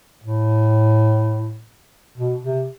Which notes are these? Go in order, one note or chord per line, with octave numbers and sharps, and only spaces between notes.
A2
B2
C3